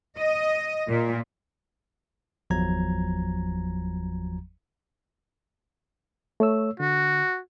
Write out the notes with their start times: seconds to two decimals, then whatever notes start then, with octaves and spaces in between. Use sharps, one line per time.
0.19 D#5
0.88 A#2
2.50 G1 E2 F3 F#3 A#5 G#6
6.40 A3 C#5 E6
6.80 D3 F#4